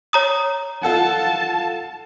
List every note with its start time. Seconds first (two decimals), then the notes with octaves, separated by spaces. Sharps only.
0.13 C#5 A#5 D#6
0.83 F4 A4 F#5 A5